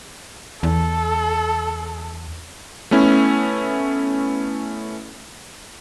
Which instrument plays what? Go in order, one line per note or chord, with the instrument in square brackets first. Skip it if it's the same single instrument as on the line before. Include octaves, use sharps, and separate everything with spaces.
[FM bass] E2 [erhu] A4
[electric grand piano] A3 B3 C#4 E4